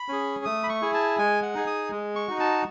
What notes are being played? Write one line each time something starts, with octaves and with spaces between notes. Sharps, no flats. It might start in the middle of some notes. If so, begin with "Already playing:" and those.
Already playing: B5
C#4 G#4
A3 D#6
B5
C#6
E4 G#4
A5
G#3 G#5
F#5
D#4 G#4
D#6
G#3
C#6
D#4 F#4
A5